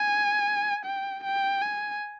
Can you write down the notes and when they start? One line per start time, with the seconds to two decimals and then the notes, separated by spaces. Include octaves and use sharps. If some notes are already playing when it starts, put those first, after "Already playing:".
Already playing: G#5
0.85 G5
1.23 G5
1.61 G#5